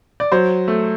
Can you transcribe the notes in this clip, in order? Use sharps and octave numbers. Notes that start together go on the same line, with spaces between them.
D5
F#3 C5
A3